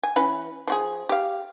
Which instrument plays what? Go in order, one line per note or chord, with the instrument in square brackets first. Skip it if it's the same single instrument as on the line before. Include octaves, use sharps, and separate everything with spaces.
[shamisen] G#5
E3 C#4 B4
F3 F#4 G#4
G4 F5